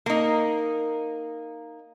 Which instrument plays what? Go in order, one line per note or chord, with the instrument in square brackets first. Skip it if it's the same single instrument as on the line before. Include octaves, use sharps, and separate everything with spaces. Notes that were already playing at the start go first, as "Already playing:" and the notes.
[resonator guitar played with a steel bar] A#3 D#4